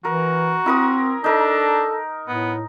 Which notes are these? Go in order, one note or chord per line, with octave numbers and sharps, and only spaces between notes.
E3 F#4 A#4
C4 E4 A#4 D#6
D4 D#4 A4 A#4
A2 B3